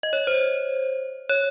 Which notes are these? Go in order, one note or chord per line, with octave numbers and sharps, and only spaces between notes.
D#5
C#5
C5
C#5